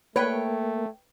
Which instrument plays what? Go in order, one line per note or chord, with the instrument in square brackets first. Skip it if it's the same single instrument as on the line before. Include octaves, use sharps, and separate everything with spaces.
[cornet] A3 [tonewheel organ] A#3 [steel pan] B4 [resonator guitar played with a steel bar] C#5 G5